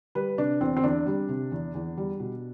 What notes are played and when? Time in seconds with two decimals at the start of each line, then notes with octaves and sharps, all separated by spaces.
0.15 G3 B4
0.38 C3 D4
0.61 E2 C4
0.77 C4
0.84 E2 D4
1.06 G3
1.29 C3
1.52 E2
1.75 E2
1.97 G3
2.20 B2